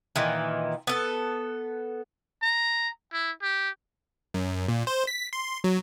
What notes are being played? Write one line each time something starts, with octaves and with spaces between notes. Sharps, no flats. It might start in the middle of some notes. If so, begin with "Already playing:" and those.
A#2 D#3 E3
B3 A4
A#5
E4
G4
F#2
A#2
C5
B6
C6
F#3